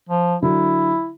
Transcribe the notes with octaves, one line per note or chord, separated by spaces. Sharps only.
F3
D3 F#3 E4